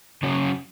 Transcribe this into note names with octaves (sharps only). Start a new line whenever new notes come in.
C#3 F#3 C#4 F#4